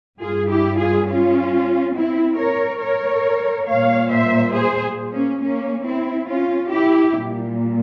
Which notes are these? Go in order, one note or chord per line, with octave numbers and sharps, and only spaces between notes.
G2 G3 F4 G#4
E4 G4
F4 G#4
C#4 F4
C4 E4
A#4 C#5
A#4 C#5
A#2 G3 C#5 F5
C5 E5
G#4 C5
A#3 C#4
A#3 C#4
C4 E4
C#4 F4
E4 G4
A#2 G3